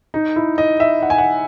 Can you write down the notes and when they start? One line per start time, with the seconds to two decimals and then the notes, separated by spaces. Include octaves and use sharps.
0.14 D#4
0.36 E4
0.58 D#5
0.80 E5
1.02 F#5
1.10 G#5
1.18 F#5